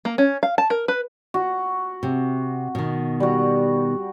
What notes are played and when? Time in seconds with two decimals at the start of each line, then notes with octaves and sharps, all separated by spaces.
0.05 A#3
0.18 C#4
0.43 F5
0.58 A5
0.70 A#4
0.88 B4
1.34 F#4
2.03 C3
2.75 B2 D#3
3.20 G3 F#4